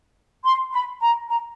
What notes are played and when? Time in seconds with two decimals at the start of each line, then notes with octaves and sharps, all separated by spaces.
0.45 C6
0.72 B5
1.01 A#5
1.29 A#5